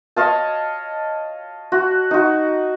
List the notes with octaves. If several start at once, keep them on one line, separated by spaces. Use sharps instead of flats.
C#5 D#5 F5 A5
F#4
D#4 F#4